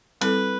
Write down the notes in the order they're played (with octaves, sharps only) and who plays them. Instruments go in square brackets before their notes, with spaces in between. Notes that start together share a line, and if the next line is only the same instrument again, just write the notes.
[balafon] G3 C4 E4 A4 [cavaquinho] B4